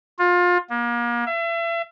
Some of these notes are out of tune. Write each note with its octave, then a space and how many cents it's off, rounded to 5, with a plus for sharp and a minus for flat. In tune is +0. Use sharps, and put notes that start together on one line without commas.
F4 +25
A#3 +35
E5 +35